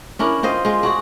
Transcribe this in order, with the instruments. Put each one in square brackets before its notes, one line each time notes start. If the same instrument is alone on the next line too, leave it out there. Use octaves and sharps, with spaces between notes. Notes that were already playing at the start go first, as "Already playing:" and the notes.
[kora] C#4 D4 E4 A#4
C4 F4 C5 D#5
G#3 F4
D4 F#4 G#4